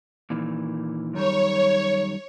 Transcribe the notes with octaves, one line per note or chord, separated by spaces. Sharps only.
A#2 D#3 E3
F#2 D#3 G3 C#5